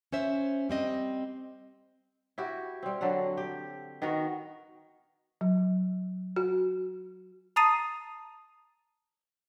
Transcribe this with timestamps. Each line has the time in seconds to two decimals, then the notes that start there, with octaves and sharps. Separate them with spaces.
0.12 C#4 C5 E5
0.69 G3 C4 D#5
2.38 E4 F#4 G4
2.83 G3 C4
3.01 D3 F#3 A4 F#5
3.37 G4
4.02 D#3 B3 F#4 A#4
5.41 F#3
6.36 F#4
7.56 A5 A#5 D#6 A6 C7 D#7